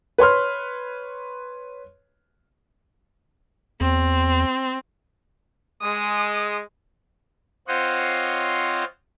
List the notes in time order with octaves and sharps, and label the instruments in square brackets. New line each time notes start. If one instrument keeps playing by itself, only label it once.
[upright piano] B4 C#5 C6 F6
[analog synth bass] E2 [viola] C4
[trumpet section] G#3 [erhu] D#6
[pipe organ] C4 F4 C5 C#5 D#5 F#5